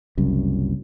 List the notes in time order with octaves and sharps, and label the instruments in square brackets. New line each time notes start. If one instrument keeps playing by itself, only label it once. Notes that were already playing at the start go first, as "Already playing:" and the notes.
[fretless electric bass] F#1 C2 F#2